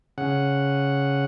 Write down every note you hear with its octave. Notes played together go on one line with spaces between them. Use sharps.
C#3 F#5